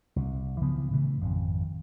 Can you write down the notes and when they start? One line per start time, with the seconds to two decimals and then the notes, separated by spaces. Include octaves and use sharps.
0.16 C2
0.61 C#3 E3 F3 B3
0.91 A#2 C#3 E3 A3
1.21 G#1 F2